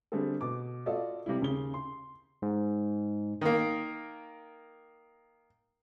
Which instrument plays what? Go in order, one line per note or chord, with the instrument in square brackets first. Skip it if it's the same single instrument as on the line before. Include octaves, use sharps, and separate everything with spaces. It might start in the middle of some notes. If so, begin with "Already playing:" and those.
[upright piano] D3 G3 A3 C4 G#4 A4
B2 D6
F4 F#4 A4 D5 D#5 F5
C3 G3 E4
D#2 C#3 G7
C6
[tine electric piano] G#2
[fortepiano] D#3 A#3